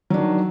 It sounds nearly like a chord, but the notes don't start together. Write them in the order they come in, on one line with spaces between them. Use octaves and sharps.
F#3 D4 D#3